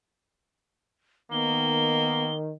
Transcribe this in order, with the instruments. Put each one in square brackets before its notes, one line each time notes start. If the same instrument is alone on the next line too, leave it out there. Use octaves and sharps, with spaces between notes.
[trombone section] D#3 [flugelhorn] A#3 [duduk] B3 [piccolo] G7